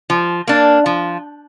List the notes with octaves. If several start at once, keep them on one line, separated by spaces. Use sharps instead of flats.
F3
A#3 D4
F3